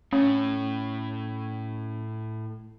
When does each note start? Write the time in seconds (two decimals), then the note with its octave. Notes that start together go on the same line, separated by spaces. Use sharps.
0.13 A2 C#4